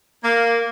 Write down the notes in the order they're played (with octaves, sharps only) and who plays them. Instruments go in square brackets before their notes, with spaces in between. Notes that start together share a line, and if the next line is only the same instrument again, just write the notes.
[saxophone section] A#3